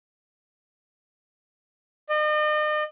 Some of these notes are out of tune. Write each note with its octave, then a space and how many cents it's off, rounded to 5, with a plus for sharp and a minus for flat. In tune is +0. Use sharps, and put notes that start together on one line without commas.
D#5 -40